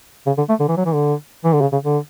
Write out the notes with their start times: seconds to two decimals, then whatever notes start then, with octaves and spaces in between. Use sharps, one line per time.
0.26 C#3
0.38 D3
0.49 A3
0.60 D3
0.68 E3
0.77 F#3
0.85 E3
0.94 D3
1.44 E3
1.53 D3
1.61 C#3
1.72 C#3
1.84 D3